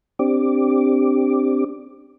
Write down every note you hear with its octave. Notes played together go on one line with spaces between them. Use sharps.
C4 D4 G4 D6